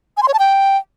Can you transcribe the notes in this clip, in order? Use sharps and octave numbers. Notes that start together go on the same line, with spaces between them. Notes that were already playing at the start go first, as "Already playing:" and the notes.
G#5
C6
C#5
A5
G5